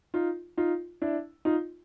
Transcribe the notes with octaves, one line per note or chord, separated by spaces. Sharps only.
D#4 F4
D#4 F4
D4 E4
D#4 F4